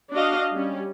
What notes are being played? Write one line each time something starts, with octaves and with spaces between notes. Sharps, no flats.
D4 F#4 D#5 F5
G3 C#4